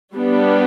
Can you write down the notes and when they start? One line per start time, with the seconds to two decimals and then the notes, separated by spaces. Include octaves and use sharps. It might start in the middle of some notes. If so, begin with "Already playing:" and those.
0.13 G3 B3 D4 G4